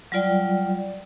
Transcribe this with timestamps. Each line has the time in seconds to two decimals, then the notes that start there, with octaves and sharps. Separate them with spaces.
0.12 F#3 G3 F4 D5 G5